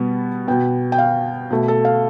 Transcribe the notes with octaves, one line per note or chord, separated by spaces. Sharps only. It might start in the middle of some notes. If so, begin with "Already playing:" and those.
Already playing: B2 G3 B3
B2 B3 G5
G5
F5
B2 A3
A4
F5